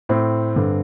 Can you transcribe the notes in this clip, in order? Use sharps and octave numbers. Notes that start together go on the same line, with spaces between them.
A2 C4
G2 D3